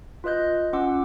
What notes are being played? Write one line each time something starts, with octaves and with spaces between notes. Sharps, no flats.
F4 B4 D#5 F#6 G6
C#4 F4 F#5 D6 E6